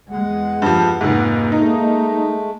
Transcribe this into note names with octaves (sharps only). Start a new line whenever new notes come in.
E2 G#3 F#5
G2 F3
F1 G#2 A#3
G#3 A3 D#4